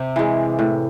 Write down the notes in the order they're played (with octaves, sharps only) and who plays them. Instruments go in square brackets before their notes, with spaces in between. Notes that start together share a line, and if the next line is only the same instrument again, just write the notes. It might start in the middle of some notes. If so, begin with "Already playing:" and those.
Already playing: [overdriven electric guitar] C3
[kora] E3 G#3
A2